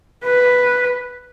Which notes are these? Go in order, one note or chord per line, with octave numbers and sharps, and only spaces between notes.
B4